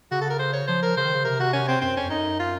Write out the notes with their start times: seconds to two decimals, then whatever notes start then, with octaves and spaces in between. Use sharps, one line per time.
0.11 C#3 F#4
0.21 A4
0.30 A#4
0.39 C5
0.53 C#5
0.67 F3 C5
0.82 A#4
0.97 C#3 C5
1.05 D#3
1.15 C#3
1.24 C3 A#4
1.40 F#4
1.53 C#4
1.68 C4
1.81 F#2 C4
1.96 F2 C#4
2.10 F#2 D#4
2.39 F4